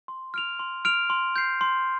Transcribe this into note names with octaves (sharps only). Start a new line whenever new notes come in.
C6
F6 D7 F7
C6
F6 D7 F7
C6
G6 C7
C6